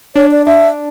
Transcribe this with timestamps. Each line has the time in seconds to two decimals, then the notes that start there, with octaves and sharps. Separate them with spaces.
0.15 D4 C#5
0.31 D5
0.46 D4 E5